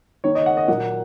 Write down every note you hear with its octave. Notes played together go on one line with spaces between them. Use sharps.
D#3 A#3 C#5
D#5
F#5
D#5
A#2 F#3 A#3 F#5